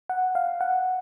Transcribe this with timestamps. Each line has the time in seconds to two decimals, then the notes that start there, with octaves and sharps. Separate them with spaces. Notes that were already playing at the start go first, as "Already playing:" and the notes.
0.09 F#5
0.35 F5
0.61 F#5